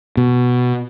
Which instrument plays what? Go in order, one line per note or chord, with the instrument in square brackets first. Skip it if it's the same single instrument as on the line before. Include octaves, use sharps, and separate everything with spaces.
[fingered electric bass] B2